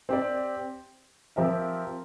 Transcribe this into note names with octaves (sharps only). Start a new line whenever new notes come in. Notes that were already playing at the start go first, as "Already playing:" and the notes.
C4 G4 D5
F3 C4 G4 A#4 E5